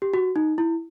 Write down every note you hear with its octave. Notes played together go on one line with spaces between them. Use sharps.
G4
F#4
D#4
E4